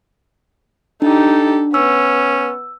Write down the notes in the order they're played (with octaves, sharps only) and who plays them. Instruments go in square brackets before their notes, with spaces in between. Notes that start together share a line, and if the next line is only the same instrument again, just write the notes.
[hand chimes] D4 [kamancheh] D#4 G4 [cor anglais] A4
[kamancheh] B3 [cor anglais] C#4 [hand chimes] E6